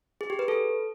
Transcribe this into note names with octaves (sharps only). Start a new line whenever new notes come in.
G#4
G4
B4
A4